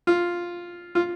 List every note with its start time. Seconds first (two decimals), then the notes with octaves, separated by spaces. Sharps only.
0.07 F4
0.95 F4